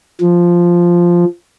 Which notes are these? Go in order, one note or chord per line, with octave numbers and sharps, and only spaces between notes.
F3